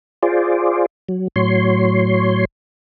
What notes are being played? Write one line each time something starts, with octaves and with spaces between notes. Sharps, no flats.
F4 G#4 C5 D5
F#3
A2 F#3 C#5 C6